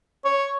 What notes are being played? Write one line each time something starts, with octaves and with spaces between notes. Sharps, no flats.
C#5